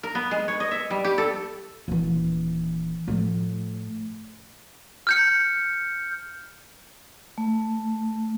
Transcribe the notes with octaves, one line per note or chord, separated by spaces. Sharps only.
A#4
B3
G#3
C#5
D#5
E5
G3
G4
A4
D#1 E3
A2 F3
F6 G6 C#7
A3